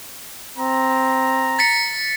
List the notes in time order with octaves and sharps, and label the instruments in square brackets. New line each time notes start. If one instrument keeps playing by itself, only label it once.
[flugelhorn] C4 [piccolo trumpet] A#5
[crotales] A6 B6 C#7